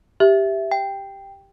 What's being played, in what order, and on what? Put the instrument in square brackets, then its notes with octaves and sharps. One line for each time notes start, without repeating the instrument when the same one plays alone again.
[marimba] G4 [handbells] E5
[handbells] G5